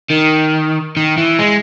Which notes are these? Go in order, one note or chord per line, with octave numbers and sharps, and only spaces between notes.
D#3
D#3
E3
G#3